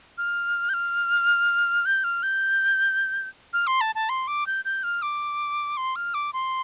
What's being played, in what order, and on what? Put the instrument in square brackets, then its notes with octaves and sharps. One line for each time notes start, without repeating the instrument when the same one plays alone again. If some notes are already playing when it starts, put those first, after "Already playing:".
[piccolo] F6
G6
F6
G6
F6
G6
F6
C6
A5
A5
C6
D6
G6
G6
F6
D6
C6
F6
D6
C6